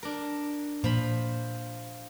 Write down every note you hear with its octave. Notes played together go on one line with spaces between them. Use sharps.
D4 A#4
A#2 F3 B5